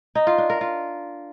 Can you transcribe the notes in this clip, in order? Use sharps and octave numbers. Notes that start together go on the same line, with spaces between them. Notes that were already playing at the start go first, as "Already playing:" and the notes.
D#4
F4
D4
A#4
F4